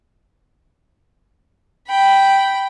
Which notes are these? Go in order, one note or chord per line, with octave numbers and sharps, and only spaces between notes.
G5 B5